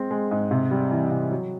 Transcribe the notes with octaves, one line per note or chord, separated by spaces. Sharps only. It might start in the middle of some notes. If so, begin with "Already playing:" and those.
Already playing: G#3 C4
G#3
G#2
C3
G3
E3
C3
F#3